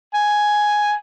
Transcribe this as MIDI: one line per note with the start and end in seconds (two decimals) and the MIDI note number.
0.14 0.94 80